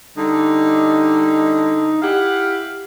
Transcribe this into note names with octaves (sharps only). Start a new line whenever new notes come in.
D3 G3 D#4
E4 G4 F5 F#5